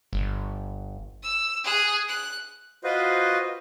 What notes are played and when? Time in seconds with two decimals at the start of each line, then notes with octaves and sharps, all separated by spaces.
0.13 G1
1.23 E6
1.64 G#4 F#6
2.08 F#6
2.84 F4 F#4 B4 C5 D#5